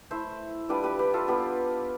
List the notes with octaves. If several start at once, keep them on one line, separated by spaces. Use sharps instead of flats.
A3 E4 C5 E5
G3 D4 F4 B4 D5
G4 B4
G4 B4
F4 A4
B3 D4 F4 G4 B4